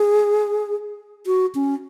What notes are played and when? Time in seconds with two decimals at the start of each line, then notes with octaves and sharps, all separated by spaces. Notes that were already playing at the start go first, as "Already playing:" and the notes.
Already playing: G#4
1.26 F#4
1.55 C#4